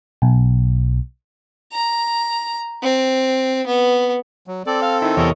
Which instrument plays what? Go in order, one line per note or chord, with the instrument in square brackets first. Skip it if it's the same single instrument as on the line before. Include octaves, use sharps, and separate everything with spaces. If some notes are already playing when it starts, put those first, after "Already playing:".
[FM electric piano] B1
[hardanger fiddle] A#5
C4
B3
[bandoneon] F#3
[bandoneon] C4 A4 [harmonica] D5
[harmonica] F5
[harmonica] D#3 [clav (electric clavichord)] E4
[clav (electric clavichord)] E2 C3 E4 [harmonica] A#4 C#5 D#5